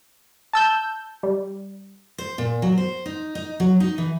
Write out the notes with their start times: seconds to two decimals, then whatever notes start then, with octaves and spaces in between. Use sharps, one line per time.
0.53 A5 E6 G6
1.23 G3
2.18 C5
2.38 A#2
2.62 F#3
2.78 C5
3.06 D#4
3.35 D#4
3.60 F#3
3.80 D#4
3.98 E3